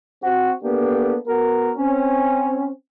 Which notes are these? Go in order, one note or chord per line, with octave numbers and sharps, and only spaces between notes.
C4 F#4
A#3 B3 D4 G4 A4
B3 F#4 A#4
C4 C#4